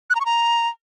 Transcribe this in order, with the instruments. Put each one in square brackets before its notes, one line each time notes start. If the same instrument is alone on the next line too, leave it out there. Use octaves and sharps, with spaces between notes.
[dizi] F#6
A#5
C#6
A#5